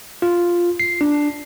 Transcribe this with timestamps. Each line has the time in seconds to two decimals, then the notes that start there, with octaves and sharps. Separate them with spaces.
0.22 F4
0.80 C7
1.01 D4